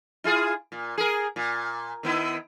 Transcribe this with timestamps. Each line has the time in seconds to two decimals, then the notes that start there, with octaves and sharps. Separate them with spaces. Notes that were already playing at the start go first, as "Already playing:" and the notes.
0.24 E4 F4 G#4
0.72 A#2
0.98 G#4 A#4
1.36 A#2
2.03 D#3 B3 E4